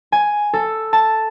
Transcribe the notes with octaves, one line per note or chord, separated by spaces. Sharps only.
G#5
A4
A5